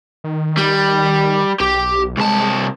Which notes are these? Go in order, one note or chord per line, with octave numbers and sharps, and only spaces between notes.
D#3
G3
B1 G4
C2 G#3 A5